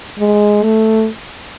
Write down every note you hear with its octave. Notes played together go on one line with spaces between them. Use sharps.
G#3
A3